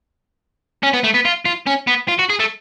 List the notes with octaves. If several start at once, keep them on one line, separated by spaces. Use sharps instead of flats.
C#4
B3
A3
B3
F4
F4
C#4
B3
F4
F#4
G#4
A3